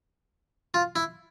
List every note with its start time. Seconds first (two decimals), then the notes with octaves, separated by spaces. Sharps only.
0.74 F4
0.96 E4